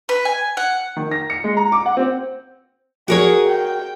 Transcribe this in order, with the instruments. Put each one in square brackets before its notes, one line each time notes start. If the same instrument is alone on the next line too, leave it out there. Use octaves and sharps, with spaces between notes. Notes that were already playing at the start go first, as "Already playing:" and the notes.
[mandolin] B4
G#5
F#5
[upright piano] D#3
A#6
C#7
G#3
A#5
D6
F#5
C4
[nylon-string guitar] F#4 A#4 C#5 [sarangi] G#4
[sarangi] G5